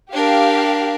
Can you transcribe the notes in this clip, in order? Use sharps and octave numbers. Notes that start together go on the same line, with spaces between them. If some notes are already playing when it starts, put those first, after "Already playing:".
D4 G4 A#4 F5